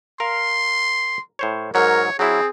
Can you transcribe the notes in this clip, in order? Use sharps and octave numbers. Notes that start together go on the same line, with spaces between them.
A#4 F5 C6
A2 C5 C#5
G#2 F#3 A#4 C#5
F#3 C4 E4 G#4